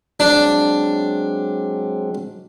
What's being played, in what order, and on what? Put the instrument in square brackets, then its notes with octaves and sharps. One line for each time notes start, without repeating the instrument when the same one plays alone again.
[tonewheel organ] F#3 G#3 C4 [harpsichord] D4